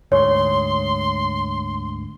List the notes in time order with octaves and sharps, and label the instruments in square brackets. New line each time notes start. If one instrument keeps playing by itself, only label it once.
[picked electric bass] D2 G#2 [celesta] C#5 [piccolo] C6